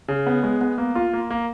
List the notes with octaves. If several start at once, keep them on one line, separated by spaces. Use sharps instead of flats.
C#3
B3
G#3
B3
A#3
F4
A#3
A#3